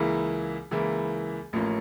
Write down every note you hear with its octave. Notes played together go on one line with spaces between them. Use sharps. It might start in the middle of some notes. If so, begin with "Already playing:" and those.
Already playing: C#2 C#3 E3 A#3 E4
C#2 C#3 E3 A#3 E4
A1 A2 F3 A#3 C#4